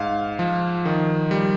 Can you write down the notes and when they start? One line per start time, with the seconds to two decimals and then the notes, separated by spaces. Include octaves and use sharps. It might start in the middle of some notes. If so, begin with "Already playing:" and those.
Already playing: G#2 F5
0.39 F3
0.85 D#3
1.31 G3